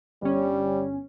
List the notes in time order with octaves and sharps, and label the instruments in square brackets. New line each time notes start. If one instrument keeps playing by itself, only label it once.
[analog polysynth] G1 C#4 [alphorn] G3